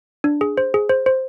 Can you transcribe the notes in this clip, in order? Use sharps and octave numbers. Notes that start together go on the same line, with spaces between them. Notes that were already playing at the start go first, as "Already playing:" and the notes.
D4
G#4
C5
G#4
C5
C5